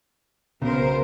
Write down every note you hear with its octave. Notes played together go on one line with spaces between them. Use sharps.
B1 C#3 B3 A#4 C5